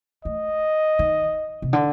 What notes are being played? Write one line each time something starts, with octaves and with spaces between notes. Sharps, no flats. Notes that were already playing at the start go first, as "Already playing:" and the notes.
A3 D#5
D#3
C3
D3